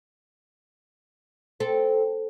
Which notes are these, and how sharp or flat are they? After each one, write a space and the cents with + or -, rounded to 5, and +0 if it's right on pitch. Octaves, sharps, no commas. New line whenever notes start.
C4 +0 A4 +0